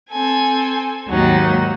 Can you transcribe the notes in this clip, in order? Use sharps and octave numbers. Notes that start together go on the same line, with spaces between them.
C4 A4 G#5
D#2 G#2 F#3 D#4 F#5